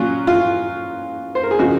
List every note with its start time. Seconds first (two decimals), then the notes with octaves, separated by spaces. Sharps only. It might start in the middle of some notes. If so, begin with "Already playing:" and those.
Already playing: A#2 F#3 C#4 F4
0.27 F4
1.35 C5
1.43 A#4
1.51 G#4
1.59 C#3 F3 C4 D#4 F#4